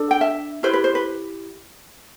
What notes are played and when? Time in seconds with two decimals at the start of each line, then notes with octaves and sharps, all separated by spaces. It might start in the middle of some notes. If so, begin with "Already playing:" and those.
Already playing: D4 A4
0.11 G5
0.21 E5
0.63 E4 G4 B4 C5
0.73 B4
0.84 C5
0.95 B4